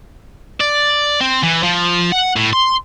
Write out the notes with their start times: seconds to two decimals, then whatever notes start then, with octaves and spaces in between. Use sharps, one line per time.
0.60 D5
1.21 C4
1.43 E3
1.63 F3
2.12 F#5
2.36 A2
2.53 C6